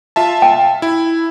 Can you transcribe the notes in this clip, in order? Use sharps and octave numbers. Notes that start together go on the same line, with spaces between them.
F4 E5 A5
G5
E4